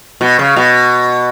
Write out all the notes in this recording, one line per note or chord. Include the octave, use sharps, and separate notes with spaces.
B2
C#3
B2